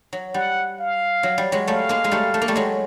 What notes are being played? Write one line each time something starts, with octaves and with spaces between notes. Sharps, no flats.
F#3
G3 F#5
F5
F#3
G3
F#3 G#3
G3 A3 F5
G#3 A#3
G#3
G3 A3
A3
A#3
G3 A3
F#3 G#3